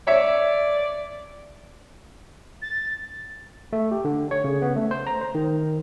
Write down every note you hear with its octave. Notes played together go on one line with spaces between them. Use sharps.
C#5 D5 E5
A6
A3
G4
D3
C#5
C#3
B3
A3
C5
A#5
C5
D#3